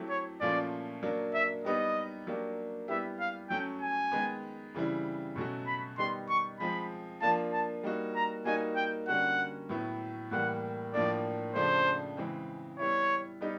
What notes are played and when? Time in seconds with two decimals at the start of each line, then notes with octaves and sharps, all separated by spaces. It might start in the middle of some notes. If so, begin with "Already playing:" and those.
Already playing: F#3 A3 C4 E4 G4
0.10 C#5
0.41 A#2 F3 A3 C#4 F4 D5
1.03 F#3 A#3 D4
1.34 E5
1.64 G3 B3 D#4 G4 D#5
2.27 F#3 A#3 D4 G4
2.88 G3 B3 E4 G4 E5
3.20 F5
3.50 F#3 A3 C#4 G5
3.82 G#5
4.12 D#3 G#3 B3
4.74 C#3 E3 G3 C4 E4
5.36 B2 F#3 A3 C#4 F#4
5.67 B5
5.98 D#3 G3 B3 D#4 G4 C6
6.29 C#6
6.60 F3 G#3 C4 B5
7.22 F3 A#3 D4 F4 A5
7.53 A5
7.83 G3 A#3 D#4 F#4
8.15 A#5
8.45 G3 A#3 D#4 F#4 G#5
8.76 G5
9.08 D3 G3 A#3 C#4 F#4 F#5
9.69 A2 F#3 B3 E4
10.31 A2 E3 G3 A#3 F#5
10.94 A2 F3 A#3 D4 D5
11.55 C#3 F3 A3 D4 C5
12.17 C#3 E3 G#3 C4
12.79 G3 B3 E4 C#5
13.41 G3 B3 D#4 G4